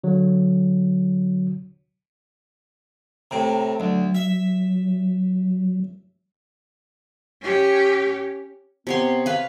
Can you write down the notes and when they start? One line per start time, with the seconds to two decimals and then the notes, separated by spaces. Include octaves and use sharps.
0.04 D3 F#3
3.31 A2 C3 A#5
3.80 D2 F#3
4.15 E5
7.42 C#4 G4
8.87 C3 B3 C#5 C6
9.26 B4 F5